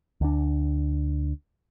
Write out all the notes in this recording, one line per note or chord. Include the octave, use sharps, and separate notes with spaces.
D2 D4